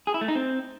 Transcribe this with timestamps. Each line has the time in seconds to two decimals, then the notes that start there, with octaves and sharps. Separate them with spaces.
0.07 G#4
0.14 E4
0.21 A3
0.28 D#4
0.35 C4